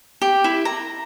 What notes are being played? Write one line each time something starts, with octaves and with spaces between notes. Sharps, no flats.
G4
E4
A#5